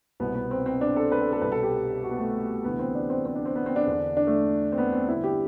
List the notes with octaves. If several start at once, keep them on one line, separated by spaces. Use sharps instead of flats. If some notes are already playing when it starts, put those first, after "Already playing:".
C2 B2 B3
B3
C4
C4
D4
A4
B4
A4
A4
C2 B2 B4
A4
G4
F#4
B3
A3
D2 C3 E3 B3
C4
D4
C4
C4
D4
C4
B3
C4
D4
E2 D3
D4
A3
C4
B3
C4
G2 D3 E4
G4